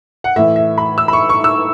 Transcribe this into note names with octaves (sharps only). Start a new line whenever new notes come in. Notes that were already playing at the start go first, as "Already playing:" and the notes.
F#5
A2 E3 E5
E5
B5
E6
B5
C#6
C#6
E6